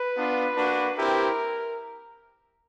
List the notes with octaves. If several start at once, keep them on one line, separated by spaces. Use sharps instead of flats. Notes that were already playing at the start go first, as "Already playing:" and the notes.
Already playing: B4
B3 D4 F4
A#3 D4 F#4
C4 E4 G4 A#4